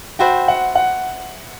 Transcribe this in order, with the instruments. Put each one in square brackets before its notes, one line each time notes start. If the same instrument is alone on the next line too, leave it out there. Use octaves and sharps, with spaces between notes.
[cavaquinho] F#4 C5 E5 B5 [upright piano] G5
[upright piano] F#5
F#5